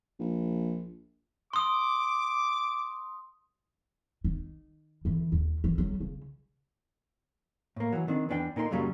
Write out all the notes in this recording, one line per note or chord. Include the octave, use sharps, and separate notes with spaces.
A#1
C6 D6 D#6
D#3
D3 E3
D#2
E3
F#3 G3
C#3
A2 A#3
E3 F#3
D#3 C4 D4
E2 E3 D4 B4 G5
A#2 D#4 A#4 C5 C6
F#2 A#2 C#3 F#3 G3